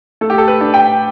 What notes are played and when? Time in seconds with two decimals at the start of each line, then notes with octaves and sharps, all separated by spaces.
0.21 A3 A4
0.30 G4
0.38 A4
0.48 B4
0.61 D4
0.74 G5